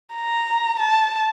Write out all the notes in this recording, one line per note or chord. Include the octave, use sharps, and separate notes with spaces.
A#5
A5